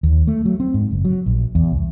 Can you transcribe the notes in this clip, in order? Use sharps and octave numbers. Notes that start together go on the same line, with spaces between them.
D#2
A3
F#3
C4
G#2
F#1
F#3
A#1
E2
C2